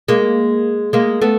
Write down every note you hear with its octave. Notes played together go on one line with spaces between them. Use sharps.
G#3 A#3
G#3 A#3
A3 B3